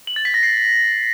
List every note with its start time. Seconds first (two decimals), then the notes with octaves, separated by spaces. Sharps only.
0.07 F#7
0.16 A6
0.25 B6
0.34 A#6
0.43 C7